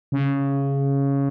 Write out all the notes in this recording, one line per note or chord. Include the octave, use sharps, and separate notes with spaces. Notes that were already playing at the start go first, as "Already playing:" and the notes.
C#3